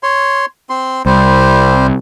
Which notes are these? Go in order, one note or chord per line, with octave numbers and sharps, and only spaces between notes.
C#5 C6
C4 C6
C2 G3 C5